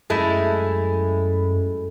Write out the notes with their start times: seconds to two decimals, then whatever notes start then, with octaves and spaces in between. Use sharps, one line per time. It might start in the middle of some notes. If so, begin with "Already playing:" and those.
0.10 F#2 G#3 A3 E4